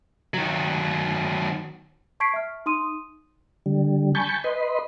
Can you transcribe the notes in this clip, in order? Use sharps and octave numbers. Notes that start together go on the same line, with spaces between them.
D#3 F#3
A5 C#6 G#6 B6 C7 D7
E5 F6
D#4 C6 D#6 D#7
D3 G3
G#5 A5 B5 C#6 G6
B4 D#5 B5 C6